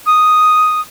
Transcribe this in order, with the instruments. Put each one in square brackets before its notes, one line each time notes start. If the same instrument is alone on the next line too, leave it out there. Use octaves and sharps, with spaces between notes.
[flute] D#6